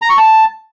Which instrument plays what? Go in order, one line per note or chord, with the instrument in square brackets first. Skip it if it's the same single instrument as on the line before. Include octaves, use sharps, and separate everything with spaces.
[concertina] A#5
C#6
A5